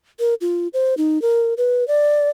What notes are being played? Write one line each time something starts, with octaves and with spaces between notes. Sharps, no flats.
A#4
F4
C5
D#4
A#4
B4
D5